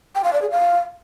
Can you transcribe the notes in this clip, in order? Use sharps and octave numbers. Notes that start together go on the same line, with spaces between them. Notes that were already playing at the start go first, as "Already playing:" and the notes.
G5
F5
D5
G#4
F5